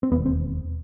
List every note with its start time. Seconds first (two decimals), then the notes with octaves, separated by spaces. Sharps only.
0.03 C4
0.11 E1 D#2 B3
0.26 C4